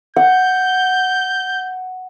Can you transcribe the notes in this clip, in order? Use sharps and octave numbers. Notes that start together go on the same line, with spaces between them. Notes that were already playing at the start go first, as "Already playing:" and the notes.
F#5 G6